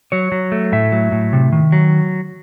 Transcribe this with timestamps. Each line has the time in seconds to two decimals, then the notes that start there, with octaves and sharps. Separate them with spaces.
0.12 F#3 C#5
0.32 F#3
0.52 A3
0.72 A2 E5
0.92 F#3
1.12 A2
1.33 C3
1.52 D#3
1.72 F#3